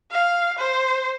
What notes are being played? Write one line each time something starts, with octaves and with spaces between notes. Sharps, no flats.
F5
C5